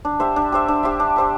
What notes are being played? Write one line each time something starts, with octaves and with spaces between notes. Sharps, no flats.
D4
G4 C5 E5
D4
G4 C5 E5
D4
G4 C5 E5
D4
G4 C5 E5